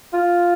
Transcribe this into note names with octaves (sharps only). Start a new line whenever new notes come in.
F4